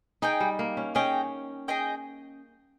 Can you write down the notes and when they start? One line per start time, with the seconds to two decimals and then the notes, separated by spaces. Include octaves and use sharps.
0.22 D#4 G#4 D#5 G5
0.40 G3
0.59 A#3
0.77 C#4
0.95 C#4 G#4 D#5 G5
1.68 G#4 D#5 G5